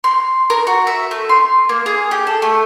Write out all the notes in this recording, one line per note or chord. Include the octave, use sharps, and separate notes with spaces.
C6
A#4
F#4
E5
A3
C6
A#3
G#4
G4
A4
A3